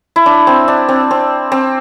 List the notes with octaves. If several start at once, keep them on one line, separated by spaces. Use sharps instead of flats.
E4
D4
C4
D4
C4
C4
C4